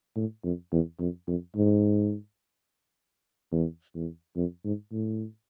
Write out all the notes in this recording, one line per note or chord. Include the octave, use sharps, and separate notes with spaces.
A2
F2
E2
F2
F2
G#2
E2
E2
F2
G#2
A2